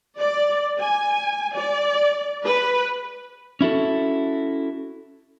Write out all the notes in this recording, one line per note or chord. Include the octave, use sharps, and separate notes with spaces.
D5
G#5
D5
B4
C#4 E4 F#4 A4